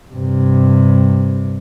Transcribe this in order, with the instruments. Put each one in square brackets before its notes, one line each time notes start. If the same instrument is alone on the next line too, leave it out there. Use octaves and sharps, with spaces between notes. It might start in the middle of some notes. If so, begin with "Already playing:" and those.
[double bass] G2 C3